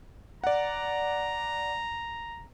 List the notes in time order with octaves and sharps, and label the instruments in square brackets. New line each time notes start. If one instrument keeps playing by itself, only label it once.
[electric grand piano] D5 F#5 [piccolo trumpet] A#5